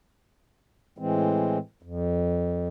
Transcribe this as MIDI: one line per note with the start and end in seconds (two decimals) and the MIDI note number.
0.98 1.58 45
0.98 1.58 52
0.98 1.58 56
0.98 1.58 60
1.83 2.68 41